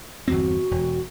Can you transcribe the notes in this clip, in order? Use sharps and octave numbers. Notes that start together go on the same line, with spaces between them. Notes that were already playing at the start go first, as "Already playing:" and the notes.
G1 E2 C4 F#4
E1